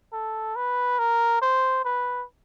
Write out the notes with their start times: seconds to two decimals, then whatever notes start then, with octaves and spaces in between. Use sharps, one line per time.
0.13 A4
0.56 B4
0.99 A#4
1.42 C5
1.85 B4